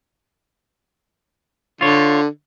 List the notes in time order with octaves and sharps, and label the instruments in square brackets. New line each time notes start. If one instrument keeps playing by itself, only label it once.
[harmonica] D3 [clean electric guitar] F4 C#5